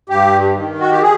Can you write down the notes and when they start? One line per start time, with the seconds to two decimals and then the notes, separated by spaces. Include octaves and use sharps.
0.09 G2 G4
0.56 D#3
0.80 F#4
0.91 G4
1.02 G#4